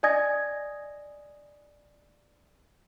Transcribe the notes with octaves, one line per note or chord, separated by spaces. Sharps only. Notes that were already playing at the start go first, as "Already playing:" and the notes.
D5 D#5 G#5 D#6 G#6 A#6